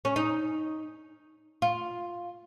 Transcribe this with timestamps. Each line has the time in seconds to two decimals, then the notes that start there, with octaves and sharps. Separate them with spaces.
0.05 C#4
0.16 D#4
1.62 F4